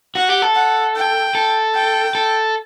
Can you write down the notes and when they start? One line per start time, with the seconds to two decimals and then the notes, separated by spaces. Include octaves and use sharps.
0.15 F#4 F#5
0.29 G4
0.42 A4
0.55 F#5
0.96 G5
1.35 A4
1.75 G5
2.15 A4